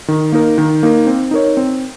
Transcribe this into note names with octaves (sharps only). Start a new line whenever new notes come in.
D#3
A#3 D#4 A#4
D#3
A#3 D#4 A#4
C4
D#4 A#4 C#5
C4